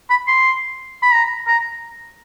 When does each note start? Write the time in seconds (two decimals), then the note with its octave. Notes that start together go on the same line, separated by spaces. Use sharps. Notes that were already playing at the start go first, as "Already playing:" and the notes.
0.10 B5
0.27 C6
1.03 B5
1.13 A#5
1.47 A#5